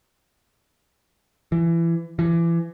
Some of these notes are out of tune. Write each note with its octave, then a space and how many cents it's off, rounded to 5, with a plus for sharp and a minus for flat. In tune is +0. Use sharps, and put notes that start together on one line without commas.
E3 +25
E3 +30